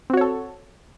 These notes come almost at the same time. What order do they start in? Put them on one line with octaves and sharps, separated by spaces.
C4 F#4 C#5 A4